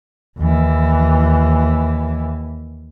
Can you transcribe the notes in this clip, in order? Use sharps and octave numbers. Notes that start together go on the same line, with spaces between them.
D#2 E3